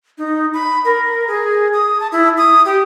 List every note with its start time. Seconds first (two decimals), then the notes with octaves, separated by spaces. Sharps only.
0.18 D#4
0.54 B5
0.85 A#4
1.28 G#4
1.73 D#6
2.00 A5
2.12 E4
2.38 D#6
2.65 G4